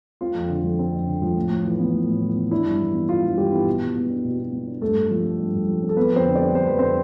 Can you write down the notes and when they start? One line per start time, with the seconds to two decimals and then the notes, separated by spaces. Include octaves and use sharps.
0.21 C4 F4
0.35 F2
0.49 D3
0.64 F3
0.79 C4
0.92 F2
1.07 D3
1.22 F3
1.36 A2
1.51 A2
1.65 E3
1.79 B3
1.94 A2
2.08 A2
2.23 E3
2.37 B3
2.51 D4 E4
2.65 G2
2.80 E3
2.94 B3
3.09 D4 F4
3.24 G2
3.37 E3 G3 G4
3.52 B3 E4
3.67 B2
3.82 B2
3.96 B3
4.10 D4
4.25 B2
4.38 B2
4.52 B3
4.67 D4
4.82 G2 A3 A4
4.96 G2
5.11 F3
5.25 C4
5.40 G2
5.54 G2
5.68 F3
5.83 C4
5.89 A4
5.97 B3 C4 B4
6.11 F2 C4 C5
6.25 D3
6.35 G3 D4 D5
6.55 C4 C5
6.67 F2 B4
6.79 D3 C4 C5